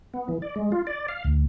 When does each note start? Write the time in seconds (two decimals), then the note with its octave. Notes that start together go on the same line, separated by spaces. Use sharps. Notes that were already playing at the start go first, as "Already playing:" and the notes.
0.14 B3
0.28 E3
0.42 D5
0.56 G#3
0.72 F4
0.87 D5
1.08 F5
1.24 D2